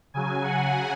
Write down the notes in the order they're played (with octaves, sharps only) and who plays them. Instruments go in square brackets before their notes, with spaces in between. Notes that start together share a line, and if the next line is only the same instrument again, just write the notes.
[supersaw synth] C#3 F#3 G#5
F#5